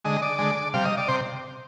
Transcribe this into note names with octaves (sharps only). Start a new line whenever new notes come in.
D3 G#3 D#5
D5
D3 G#3
C3 G3 F5
D#5
D5
C3 C5